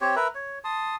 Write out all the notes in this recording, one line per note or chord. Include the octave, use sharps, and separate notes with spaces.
C4 G4 C#5
A#4 B4 E5
C#5
A5 C6 D#6